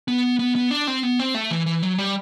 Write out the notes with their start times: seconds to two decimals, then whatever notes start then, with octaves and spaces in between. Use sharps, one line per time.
0.08 B3
0.39 B3
0.55 B3
0.71 D4
0.87 C4
1.03 B3
1.19 C4
1.35 A3
1.51 E3
1.66 E3
1.83 F#3
1.98 G3